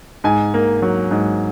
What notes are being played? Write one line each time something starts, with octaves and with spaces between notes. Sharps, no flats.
G#2 G#5
A#3
F#3
G#2